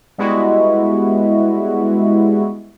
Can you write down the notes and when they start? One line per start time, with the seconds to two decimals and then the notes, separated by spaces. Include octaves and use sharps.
0.18 G3 G#3 B3 E4 F#4